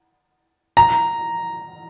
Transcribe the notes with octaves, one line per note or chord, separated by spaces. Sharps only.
A#5